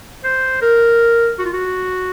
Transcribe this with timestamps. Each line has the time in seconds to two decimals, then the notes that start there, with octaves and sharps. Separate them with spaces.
0.24 C5
0.61 A#4
1.39 F#4
1.45 F4
1.53 F#4